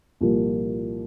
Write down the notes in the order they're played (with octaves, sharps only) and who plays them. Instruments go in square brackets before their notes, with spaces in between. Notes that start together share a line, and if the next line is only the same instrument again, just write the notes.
[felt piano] C2 A#2 F3 A#3